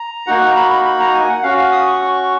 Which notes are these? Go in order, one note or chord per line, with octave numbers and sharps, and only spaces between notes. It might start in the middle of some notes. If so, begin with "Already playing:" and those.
Already playing: A#5
A#3 D#4 F#4 F#5
A#5
B5
B5
B5
A#5
G#5
F#5
C#4 F#4 F5
F5
D#6
C#6
C#6